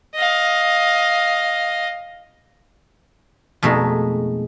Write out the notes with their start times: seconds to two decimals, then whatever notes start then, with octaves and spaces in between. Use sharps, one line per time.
0.15 D#5 F5
3.62 F2 B2 G#3 A3 D#4